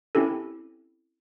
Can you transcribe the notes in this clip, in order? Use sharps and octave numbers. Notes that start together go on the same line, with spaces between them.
C4 C#4 E4 G4 A4